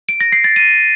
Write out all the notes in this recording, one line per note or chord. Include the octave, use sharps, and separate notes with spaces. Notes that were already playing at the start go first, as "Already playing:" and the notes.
D7
A#6
C7
A6
D#7